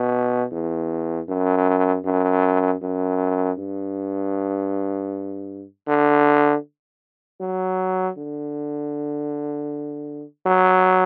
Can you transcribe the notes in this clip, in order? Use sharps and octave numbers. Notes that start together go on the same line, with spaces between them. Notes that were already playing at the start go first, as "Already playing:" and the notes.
Already playing: B2
E2
F#2
F#2
F#2
G2
D3
F#3
D3
F#3